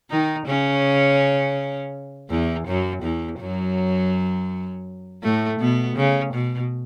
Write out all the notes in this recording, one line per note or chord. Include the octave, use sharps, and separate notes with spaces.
D#3 D#4
C#3 C#4
E2 E3
F#2 F#3
E2 E3
F#2 F#3
A2 A3
B2 B3
C#3
B2